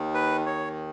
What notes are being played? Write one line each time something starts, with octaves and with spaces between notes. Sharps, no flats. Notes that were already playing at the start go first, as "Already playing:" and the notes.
Already playing: D#2 D#3
B4
C#5